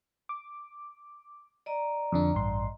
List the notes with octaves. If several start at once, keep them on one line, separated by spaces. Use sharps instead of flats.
D6
D5 D#5 A#5
F2 D3 D4
A1 G2 C6